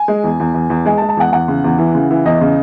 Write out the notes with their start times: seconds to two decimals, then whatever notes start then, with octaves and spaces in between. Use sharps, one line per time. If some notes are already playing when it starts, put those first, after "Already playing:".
Already playing: G#5
0.08 G#3
0.24 E2
0.40 E2
0.54 E2
0.70 E2
0.86 G#3 G#5
0.98 A5
1.02 G#3
1.09 A5
1.17 E2 F#5
1.32 E2 F#5
1.48 C#3
1.64 E2
1.78 E3
1.95 C#3
2.11 E3
2.25 E2 D#5
2.41 C#3